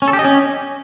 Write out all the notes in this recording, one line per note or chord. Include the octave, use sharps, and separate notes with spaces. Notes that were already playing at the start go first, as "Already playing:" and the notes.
C#4
A4
G4
D#5
C#4